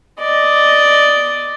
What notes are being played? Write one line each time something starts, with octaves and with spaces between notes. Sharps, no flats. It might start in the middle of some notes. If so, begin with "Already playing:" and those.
D5 D#5